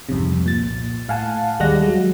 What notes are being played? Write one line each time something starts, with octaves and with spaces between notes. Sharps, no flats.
C2 F2 G#2 C3
A#2 A6
A2 F5 F#5 G#5 A5
D#2 G3 G#3 F#5 A#6
F#3 G#3